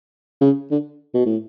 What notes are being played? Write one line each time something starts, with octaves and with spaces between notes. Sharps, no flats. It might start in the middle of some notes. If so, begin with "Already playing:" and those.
C#3
D3
B2
A2